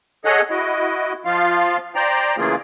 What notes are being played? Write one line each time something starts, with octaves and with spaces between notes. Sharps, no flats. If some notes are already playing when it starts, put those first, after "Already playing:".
G#4 A4 C#5 D#5 F#5
E4 F#4 D#5
F3 F4 F5
C5 D5 G5 A#5
C#3 E3 A3 A#3 F4 G#4